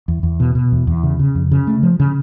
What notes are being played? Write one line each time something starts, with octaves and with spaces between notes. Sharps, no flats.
E2
E2
B2
B2
E2
E2
C#3
C#3
F2
C#3
A3
F3
C#3